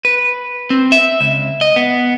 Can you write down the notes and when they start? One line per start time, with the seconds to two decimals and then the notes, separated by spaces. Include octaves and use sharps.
0.05 B4
0.70 C4
0.92 E5
1.21 C#2
1.61 D#5
1.76 B3